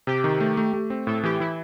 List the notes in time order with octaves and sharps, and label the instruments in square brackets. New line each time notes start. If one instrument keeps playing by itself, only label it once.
[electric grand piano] C3 [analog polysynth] G4
[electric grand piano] D#3
A3
A3
A3
C4
[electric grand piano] A2 [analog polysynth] A4
[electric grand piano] E3 [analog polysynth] G4
[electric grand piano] E3 [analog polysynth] E4